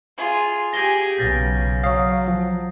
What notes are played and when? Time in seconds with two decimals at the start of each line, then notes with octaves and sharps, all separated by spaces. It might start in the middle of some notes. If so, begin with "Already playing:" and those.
0.17 F4 G#4
0.73 G4 G#4 G#5 A#6 G7
1.18 B1 C#3 G6 A6 A#6
1.84 F#3 C#5 F5 D#6 C7
2.28 F3